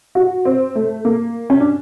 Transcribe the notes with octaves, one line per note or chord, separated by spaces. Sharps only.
F#4
C4
A3
A#3
C#4
D4